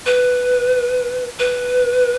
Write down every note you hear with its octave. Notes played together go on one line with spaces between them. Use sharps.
B4
B4